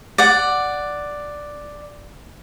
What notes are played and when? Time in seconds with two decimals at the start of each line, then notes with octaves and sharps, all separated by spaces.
0.18 D5 F#5